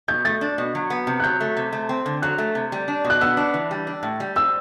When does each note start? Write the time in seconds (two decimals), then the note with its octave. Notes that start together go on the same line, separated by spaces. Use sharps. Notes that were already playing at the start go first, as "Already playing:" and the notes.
0.08 B2 G6
0.25 A3 A6
0.41 D4
0.58 B2
0.75 F#3
0.90 B3
1.07 C3
1.20 F#6
1.24 F#3 G6
1.40 A3
1.57 C3
1.73 A3
1.89 C4
2.06 D3
2.22 F#3 F#6
2.38 A3
2.55 C3
2.72 G3
2.88 D4
3.04 B2
3.10 F#6
3.21 B3 E6
3.37 D4
3.54 E3
3.71 G3
3.87 D4
4.03 A2
4.20 G3
4.36 C4 E6